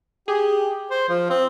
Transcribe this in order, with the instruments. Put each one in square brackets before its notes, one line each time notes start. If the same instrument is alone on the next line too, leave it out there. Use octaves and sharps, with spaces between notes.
[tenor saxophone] G4 [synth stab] G#4
[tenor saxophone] C5
F3
C4